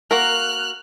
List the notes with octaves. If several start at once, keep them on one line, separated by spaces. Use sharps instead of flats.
A#3 F#4 A#4 F6 F#6